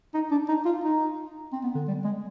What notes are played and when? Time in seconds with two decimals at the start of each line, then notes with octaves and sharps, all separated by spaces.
0.14 D#4
0.31 D4
0.49 D#4
0.65 F4
0.84 D#4
1.53 C4
1.63 B3
1.75 D3
1.88 G3
2.04 G#3